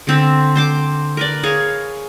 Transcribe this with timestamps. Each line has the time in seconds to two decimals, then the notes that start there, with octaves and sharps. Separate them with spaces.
0.07 D3 C4 E5
0.56 C5 C6 D6
1.17 A#4 B4 D5
1.43 G#4 C#5 F5 G#5